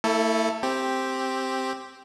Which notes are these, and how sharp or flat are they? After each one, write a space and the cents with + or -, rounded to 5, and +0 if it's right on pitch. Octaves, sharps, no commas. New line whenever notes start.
A3 +40 E4 -10 A4 +0
C4 +5 G4 +0